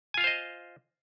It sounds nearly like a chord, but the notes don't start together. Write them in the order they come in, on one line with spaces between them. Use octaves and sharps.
G#5 F4 F5 C5 D#5